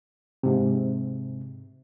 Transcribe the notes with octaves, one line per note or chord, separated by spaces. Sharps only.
G#2 C3